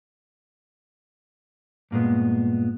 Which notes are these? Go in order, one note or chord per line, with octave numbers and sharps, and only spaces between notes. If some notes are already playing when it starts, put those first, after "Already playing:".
G2 A#2 G#3 B3